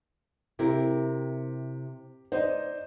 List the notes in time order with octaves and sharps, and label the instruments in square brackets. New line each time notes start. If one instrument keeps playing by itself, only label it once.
[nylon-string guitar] C3 E4 A#4 [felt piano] G4
[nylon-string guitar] D#4 [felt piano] C5 D5 D#5